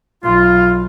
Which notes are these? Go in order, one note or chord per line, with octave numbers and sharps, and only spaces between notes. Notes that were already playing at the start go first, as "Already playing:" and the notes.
B1 F4